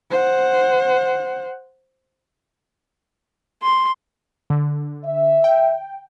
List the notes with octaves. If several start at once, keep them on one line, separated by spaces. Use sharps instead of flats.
C5 F#5
C6
D3
E5
G5